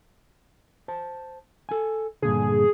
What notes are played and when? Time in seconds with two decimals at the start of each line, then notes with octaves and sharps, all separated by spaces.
0.88 C5 A5
1.69 A4 G#5
2.22 G2 A#2 D3 G#4